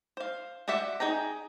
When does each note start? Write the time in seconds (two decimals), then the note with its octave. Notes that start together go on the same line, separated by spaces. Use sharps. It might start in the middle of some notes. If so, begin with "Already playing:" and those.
0.17 C5 F5
0.68 F#4 C5 D5 E5 F#5
1.00 D#4 G#4 G5 A#5